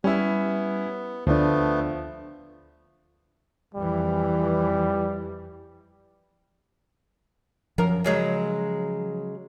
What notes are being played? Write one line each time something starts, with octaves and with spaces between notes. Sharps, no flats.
G3 B3 C#4 E4
D2 F3 A3 B3 D4
F2 E3 G3
F#2 F3 A#4
C#3 F#3 G#3